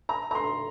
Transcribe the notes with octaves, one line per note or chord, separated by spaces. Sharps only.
A#5
A#5
C6